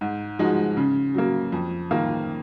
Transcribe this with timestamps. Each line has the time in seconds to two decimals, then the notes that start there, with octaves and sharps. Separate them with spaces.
0.01 G#2
0.39 F3 G#3 D#4 F#4
0.77 C#3
1.14 F#3 A#3
1.52 F2
1.91 D#3 A#3 F4